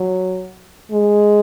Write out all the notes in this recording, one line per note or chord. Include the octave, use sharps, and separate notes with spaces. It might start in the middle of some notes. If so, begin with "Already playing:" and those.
Already playing: F#3
G#3